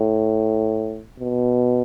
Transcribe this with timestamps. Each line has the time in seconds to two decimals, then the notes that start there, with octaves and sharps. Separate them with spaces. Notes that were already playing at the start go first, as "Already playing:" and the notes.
Already playing: A2
1.20 B2